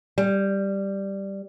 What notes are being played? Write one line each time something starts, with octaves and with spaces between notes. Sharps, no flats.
G3